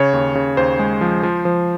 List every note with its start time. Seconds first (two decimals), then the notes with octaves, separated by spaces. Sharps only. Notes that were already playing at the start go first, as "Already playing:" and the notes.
Already playing: C#3 C#5
0.13 D#2
0.35 C#3
0.57 D#2 C5
0.79 G#3
1.01 F3
1.23 F3
1.45 F3